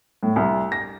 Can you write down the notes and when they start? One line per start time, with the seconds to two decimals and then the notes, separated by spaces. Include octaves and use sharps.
0.23 A2
0.36 C2
0.72 A#6